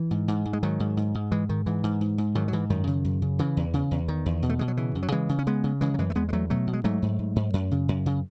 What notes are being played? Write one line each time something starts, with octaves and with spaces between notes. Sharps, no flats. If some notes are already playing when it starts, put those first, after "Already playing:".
Already playing: E3
G#2
G#2
G#2
G#3
G#2 D#3 F#3
G#2
G#2
G#2
G#2 E3 G#3
G#2 D#3
G#2 E3
G#2
G#2
G#2
G#2 D#3 F#3
F#3
G#2 E3
F#2 D#3
C#3
F#2
C#3
C#3 E3
E2
C#3
E2
E2 D#3
E2
B2
A3
B2 G#3
F#3
C#3 E3
F#2
F#3
C#3 E3 G#3
C#3
C#4
C#3 G#3 B3
C#3
C#3 E3 G#3
F#3
F#2 E3 G#3
A3
E2 G#3 B3
G#3
E2 F#3 A3
B2 F#3 A3
B2
G#3
G#2 F#3 A3
G#2
G#2
G#2
F#2
C#3
F#2
C#3